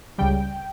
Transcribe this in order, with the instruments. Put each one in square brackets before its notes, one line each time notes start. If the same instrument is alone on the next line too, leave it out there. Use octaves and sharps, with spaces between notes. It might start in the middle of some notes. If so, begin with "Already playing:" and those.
[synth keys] C#2 C#3 G3 G5